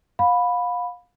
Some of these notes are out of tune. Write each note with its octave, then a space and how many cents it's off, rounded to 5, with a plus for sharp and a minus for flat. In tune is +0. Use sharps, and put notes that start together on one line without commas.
F5 +30 B5 +0